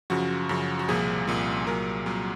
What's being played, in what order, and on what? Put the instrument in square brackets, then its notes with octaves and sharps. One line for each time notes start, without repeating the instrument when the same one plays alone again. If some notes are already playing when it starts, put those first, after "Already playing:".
[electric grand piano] F#2 C#3 F3 F#4
F#2 C#3 F3
F#4
C2 A#2 F3 G#4
C2 A#2 F3
C2 A#2 F#3 A#4
C2 A#2 F#3